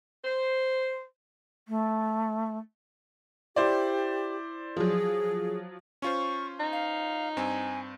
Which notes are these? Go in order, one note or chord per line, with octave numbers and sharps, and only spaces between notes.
C5
A3
E4 G4 C5 D5
F3 F#3 G#4
C#4 F4 C5 C#6
D#4
F5
G2 C4 G#5